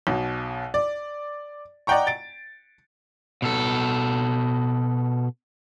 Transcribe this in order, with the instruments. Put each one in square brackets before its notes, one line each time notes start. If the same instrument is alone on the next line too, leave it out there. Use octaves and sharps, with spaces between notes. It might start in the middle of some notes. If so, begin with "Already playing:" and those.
[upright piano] B1 B2
D5
D5 D#5 F#5 G5 A#5 C#6
A6 D7
[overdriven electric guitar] B2 A4